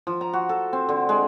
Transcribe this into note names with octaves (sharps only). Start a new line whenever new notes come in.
F3
A#5
F#4
A4
C4
D3
G#3